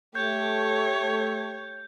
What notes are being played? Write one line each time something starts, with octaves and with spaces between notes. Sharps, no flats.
A3 G4 C#5 G6